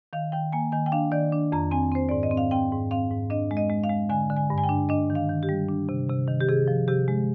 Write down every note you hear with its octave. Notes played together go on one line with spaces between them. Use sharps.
D#3 F5
D#3 G5
A#3 G#5
D#3 G#5
G5
D4 F5
D#3 D5
D4
F2 A#5
C4 G#5
C4 C5
G#2 D5
D#5
C4
F5
C4 G5
G#2
C4 F5
G#2
D4 D#5
G#3
D#5
G#3
F5
G#3
D3 G#5
D3
G#5
G2
G#5
G5
D4
D4 D#5
D#3
F5
D#3
G4
G3
D4
C3
C3
D#3
G4
C3 G#4
F3
C3 G4
G#3